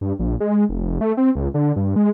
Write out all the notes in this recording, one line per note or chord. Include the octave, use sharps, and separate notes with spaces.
G2
A#1
G#3
F1
A3
C4
C#2
D3
G2
G#3